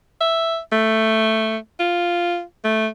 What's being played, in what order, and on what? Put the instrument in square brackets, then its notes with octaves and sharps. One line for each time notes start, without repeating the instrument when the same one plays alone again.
[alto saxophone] E5
A3
F4
A3